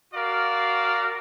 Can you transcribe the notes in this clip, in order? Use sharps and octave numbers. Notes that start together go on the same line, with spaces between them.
F#4 A#4 D5 F5